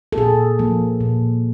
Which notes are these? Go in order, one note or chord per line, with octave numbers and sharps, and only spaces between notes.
A4
A#2 G#4
F3 A#3
A#2